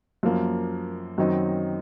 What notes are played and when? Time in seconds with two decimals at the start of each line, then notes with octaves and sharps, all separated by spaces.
0.23 F#2 F3 A#3
1.18 F#2 D#3 F#3 C4 D#4